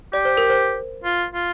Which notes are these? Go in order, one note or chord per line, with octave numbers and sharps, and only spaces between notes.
G4 D5
C5
A#4
C5
F4
F4